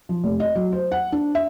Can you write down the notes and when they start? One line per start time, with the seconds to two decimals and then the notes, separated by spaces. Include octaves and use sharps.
0.09 F3
0.24 F1
0.40 D#5
0.55 F#3
0.72 C5
0.92 F#5
1.12 D4
1.35 E5